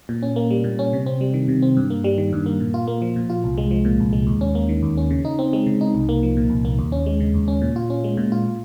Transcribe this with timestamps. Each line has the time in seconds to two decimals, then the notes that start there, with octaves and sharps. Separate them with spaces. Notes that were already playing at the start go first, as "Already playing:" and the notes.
0.09 A#2
0.23 C#4
0.36 A#3
0.51 G3
0.64 A#2
0.79 C#4
0.93 C3
1.06 C4
1.21 G3
1.34 D#3
1.48 C3
1.62 C4
1.77 G2
1.90 A#3
2.04 G3
2.18 D#3
2.33 G2
2.46 A#3
2.60 A#2
2.74 F4
2.88 A#3
3.02 F3
3.16 A#2
3.30 F4
3.44 C2
3.58 G#3
3.71 F3
3.85 A#2
4.00 C2
4.13 G#3
4.27 D#2
4.41 C#4
4.55 A#3
4.69 D#3
4.83 D#2
4.97 C#4
5.11 C#3
5.25 D#4
5.39 C4
5.53 G#3
5.66 C#3
5.81 D#4
5.95 C2
6.09 A#3
6.23 F3
6.37 A#2
6.50 C2
6.65 A#3
6.79 D#2
6.92 C#4
7.06 G#3
7.20 C#3
7.34 D#2
7.48 C#4
7.62 A#2
7.76 F4
7.90 C#4
8.04 G#3
8.17 A#2
8.32 F4